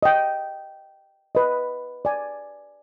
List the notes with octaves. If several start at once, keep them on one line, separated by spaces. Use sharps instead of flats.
D#5 G5
B4 D#5
D5 G#5